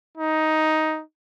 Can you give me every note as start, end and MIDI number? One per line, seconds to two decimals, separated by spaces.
0.18 1.02 63